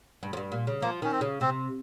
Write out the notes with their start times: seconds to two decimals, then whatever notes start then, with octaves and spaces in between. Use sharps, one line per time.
0.23 G2
0.33 F2
0.37 G2
0.52 A#2
0.67 C#3
0.82 F3 A#3
1.02 D#3 C#4
1.12 C4
1.21 C#3
1.41 C3 C4